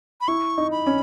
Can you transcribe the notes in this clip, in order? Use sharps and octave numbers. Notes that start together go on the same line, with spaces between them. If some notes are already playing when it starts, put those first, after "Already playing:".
B5
E4 C#6
D#4
B5
C#4